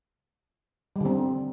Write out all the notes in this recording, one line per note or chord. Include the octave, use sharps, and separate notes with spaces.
D3 G3 C4